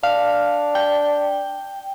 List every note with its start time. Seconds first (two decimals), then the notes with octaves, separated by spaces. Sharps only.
0.03 D4 F5
0.75 G5